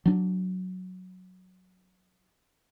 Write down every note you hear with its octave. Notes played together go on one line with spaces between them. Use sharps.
F#3 D4